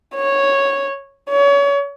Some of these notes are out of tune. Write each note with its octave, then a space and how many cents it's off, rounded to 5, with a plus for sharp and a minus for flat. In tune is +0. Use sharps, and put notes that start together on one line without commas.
C#5 -5
C#5 +30